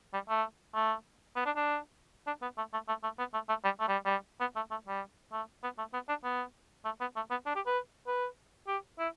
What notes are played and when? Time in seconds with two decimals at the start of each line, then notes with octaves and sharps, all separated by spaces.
0.14 G3
0.29 A3
0.74 A3
1.36 B3
1.46 D4
1.56 D4
2.27 D4
2.42 B3
2.57 A3
2.73 A3
2.88 A3
3.03 A3
3.19 B3
3.34 A3
3.49 A3
3.64 G3
3.80 A3
3.88 G3
4.05 G3
4.40 B3
4.56 A3
4.71 A3
4.87 G3
5.32 A3
5.63 B3
5.78 A3
5.93 B3
6.09 D4
6.24 B3
6.85 A3
7.00 B3
7.16 A3
7.31 B3
7.46 D4
7.56 G4
7.66 B4
8.07 B4
8.68 G4
8.99 E4